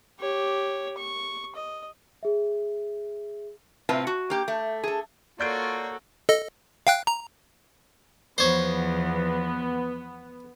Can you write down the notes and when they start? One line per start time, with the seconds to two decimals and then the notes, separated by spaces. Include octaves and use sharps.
0.20 G4 C#5
0.98 C#6
1.56 D#5
2.23 G#4 E5
3.89 A2 C3 C4 F4 B4 A5
4.07 F#4
4.30 A#3 G4
4.48 A3
4.84 G#4 A4
5.39 A#3 F4 F#4 A4 C#5 D5 G6 D7
6.29 A4 D#5
6.87 F5 G5 F#6
7.07 A#5
8.38 E2 F3 B3 C5 C#5